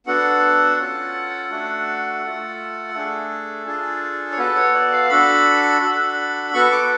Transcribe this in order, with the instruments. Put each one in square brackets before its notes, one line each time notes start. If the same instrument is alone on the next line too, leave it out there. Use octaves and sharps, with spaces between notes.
[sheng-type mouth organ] B3 D4 F#4 A4 F#5
C#4 F4 A4
A3 D4 F#4 A4
A3 F4 A4
A3 D4 G#4 A4
D4 F4 G#4
C#5
B3 F#4 A4 B4
C#5
D5
F5
D4 F#4 A4 B5
D4 F#4 A4
B3 F#4 A4 C#6
D6